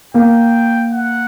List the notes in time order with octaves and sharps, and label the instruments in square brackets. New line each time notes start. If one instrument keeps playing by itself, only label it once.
[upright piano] A#3 [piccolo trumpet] G5
[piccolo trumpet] F#5